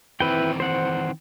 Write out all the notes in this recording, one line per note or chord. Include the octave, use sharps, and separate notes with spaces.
D#3 E3 C4 E4 B4 G5
C5 F#5